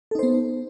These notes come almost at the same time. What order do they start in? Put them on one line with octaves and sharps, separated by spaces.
A4 D#4 C5 B3